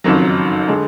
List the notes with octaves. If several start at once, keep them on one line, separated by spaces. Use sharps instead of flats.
F#1 F2 D#3 F#3
D3 G#3